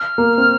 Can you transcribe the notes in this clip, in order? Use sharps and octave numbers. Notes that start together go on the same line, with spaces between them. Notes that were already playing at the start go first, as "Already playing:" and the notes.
Already playing: F6
A#3
C4